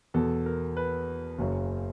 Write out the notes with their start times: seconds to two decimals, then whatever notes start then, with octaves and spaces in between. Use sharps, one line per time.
0.14 E2 B2 A4
0.46 A#4
0.77 B4
1.38 F#1 F#2 C#3